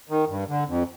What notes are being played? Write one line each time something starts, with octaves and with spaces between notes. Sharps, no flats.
D#3
G2
D3
F2